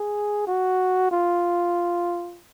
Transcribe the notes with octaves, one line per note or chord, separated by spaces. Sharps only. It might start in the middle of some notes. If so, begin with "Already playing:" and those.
Already playing: G#4
F#4
F4